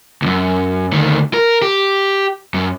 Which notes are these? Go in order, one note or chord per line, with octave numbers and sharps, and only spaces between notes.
C#2 F#2
D2 D#3
A#4
G4
F#2